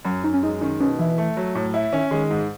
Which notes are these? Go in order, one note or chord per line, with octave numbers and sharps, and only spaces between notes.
F#2 F#3
F#2 D#4
C#4
G#3 D#4
D#3 C#4
B2 C#4
E3 E4
A3
F#3
A2
E4
D#3 C#4
D#3 G#3
G#2